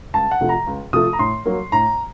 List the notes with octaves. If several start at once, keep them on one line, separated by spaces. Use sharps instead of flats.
C#2 A5
F#5
C3 F3 A3
A#5
C#2
C3 F3 A3 D#6
A#5
A2 C6
F#3 A#3
A2 A#5